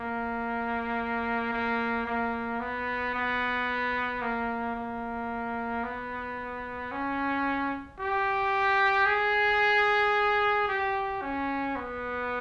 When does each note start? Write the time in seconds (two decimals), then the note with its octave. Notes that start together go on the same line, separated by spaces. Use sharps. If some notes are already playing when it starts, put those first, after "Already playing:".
Already playing: A#3
1.52 A#3
2.06 A#3
2.60 B3
3.14 B3
4.21 A#3
4.75 A#3
5.83 B3
6.92 C#4
7.99 G4
9.06 G#4
10.68 G4
11.22 C#4
11.76 B3